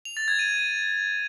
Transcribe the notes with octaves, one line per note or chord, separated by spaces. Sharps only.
F7
A6
G#6
D#7